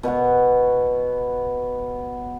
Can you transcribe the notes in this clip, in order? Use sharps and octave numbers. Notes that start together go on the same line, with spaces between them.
B2 B3 C#5 F#5